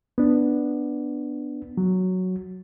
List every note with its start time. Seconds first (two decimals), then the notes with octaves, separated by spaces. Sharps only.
0.18 B3 D4
1.77 F#3